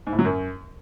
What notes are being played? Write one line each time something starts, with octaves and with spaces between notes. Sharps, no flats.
G#2
A2
F#3
F#2